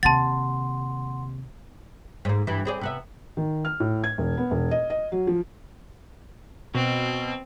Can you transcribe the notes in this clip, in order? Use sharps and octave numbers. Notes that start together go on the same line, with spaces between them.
D#2 C3 F#5 A5 C6 A6
G#2 A#3
G2 E3
C4 G#4 D5
C3 B3 E5
D#3
F6
A2
G#6
E1
B3
E1
D#5
D#5
F#3
F3
B2 C4